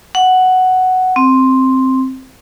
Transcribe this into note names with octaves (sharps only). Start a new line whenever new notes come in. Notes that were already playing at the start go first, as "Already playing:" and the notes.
F#5
C4